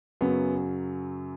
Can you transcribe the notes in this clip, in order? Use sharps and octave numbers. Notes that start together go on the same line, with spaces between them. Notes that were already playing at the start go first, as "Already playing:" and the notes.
F#2 C#3 F#3 B3